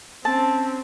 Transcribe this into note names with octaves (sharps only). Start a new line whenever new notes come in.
C4 C#4 A5